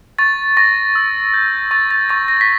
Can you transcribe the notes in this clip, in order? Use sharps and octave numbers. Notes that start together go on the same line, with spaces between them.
C#6 A6
C#6 A#6
E6
G6
C#6 A6
A6
C#6 A6
A#6
B6